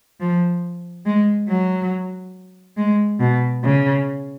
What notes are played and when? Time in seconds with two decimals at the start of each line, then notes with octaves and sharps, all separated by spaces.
0.20 F3
1.06 G#3
1.49 F#3
2.77 G#3
3.20 B2
3.64 C#3